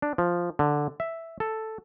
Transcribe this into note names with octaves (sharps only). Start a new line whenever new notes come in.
D4
F3
D3
E5
A4